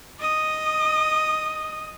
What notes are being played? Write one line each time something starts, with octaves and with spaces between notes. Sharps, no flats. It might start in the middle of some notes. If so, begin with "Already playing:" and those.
D#5 D#6